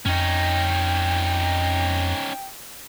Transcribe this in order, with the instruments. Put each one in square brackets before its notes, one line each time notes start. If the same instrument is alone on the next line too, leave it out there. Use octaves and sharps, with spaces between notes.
[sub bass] F2 [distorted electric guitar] C#4 D#4 [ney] G5